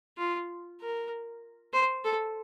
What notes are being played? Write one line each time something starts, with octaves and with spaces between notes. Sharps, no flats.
F4
A#4
C5
A4